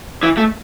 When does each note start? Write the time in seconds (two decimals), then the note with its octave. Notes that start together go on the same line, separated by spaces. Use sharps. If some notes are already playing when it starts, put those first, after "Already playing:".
0.23 E3
0.37 A3